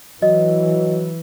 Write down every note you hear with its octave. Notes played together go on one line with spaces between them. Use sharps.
E3 F#3 D#5